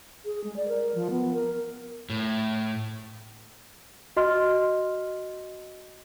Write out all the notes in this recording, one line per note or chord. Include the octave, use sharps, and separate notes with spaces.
G#4
G#3
D5
A#4
F3
B3
A#4
A2
F#4 D#5 C6 F6